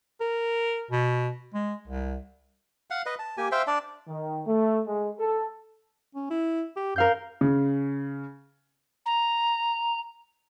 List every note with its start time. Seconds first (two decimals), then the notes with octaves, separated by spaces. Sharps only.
0.21 A#4
0.91 B2
1.54 G#3
1.88 C2
2.90 F5 F#5
3.06 B4 D#5
3.19 A5
3.37 A#3 G4 G#5
3.52 C5 E5 F5 G5
3.67 D4 D5 A5
4.08 D#3
4.46 A3
4.87 G#3
5.19 A4
6.15 C#4
6.30 E4
6.76 G4
6.96 F#2 A#4 F5 G6
7.41 C#3
9.05 A#5